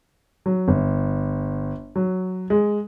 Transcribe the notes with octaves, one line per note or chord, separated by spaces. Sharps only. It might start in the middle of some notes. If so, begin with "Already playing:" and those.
F#3
G1
F#3
G#3